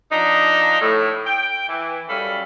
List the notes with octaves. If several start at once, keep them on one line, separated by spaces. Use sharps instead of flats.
F3 D4 D#4
A2
G5
E3
F#2 G3 C#4 A4 F5 B5